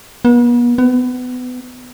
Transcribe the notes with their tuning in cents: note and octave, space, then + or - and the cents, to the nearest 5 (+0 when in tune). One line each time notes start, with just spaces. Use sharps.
B3 -40
B3 +25